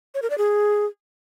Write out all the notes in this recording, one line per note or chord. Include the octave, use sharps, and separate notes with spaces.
C#5
A#4
D5
G#4